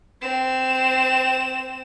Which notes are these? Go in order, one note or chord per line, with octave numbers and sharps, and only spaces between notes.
C4 E7